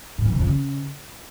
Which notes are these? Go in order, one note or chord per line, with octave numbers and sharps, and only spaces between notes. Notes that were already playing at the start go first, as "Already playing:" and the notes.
A2
E3
C3
F2
C#3